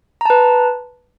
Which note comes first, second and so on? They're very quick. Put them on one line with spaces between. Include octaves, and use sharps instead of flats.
A#5 A5 B4